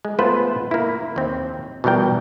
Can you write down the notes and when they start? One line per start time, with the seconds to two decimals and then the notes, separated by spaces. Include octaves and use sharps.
0.05 G#3
0.19 A3 B3 F4 B4 C5
0.71 A#3 E4
1.16 D#2 C4
1.84 B2 E3 G3 A#4 G5